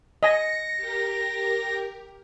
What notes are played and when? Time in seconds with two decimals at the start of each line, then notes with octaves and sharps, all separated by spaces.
0.23 D#5 G#5 A#6 C#7
0.77 G4 A#4